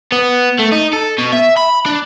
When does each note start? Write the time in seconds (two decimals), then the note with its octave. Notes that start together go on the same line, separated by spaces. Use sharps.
0.12 B3
0.60 A3
0.72 D#4
0.93 A4
1.18 B2
1.33 E5
1.57 B5
1.86 D4